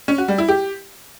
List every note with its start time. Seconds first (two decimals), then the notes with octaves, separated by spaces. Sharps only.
0.08 C#4
0.18 F#4
0.28 G3
0.38 E4
0.48 G4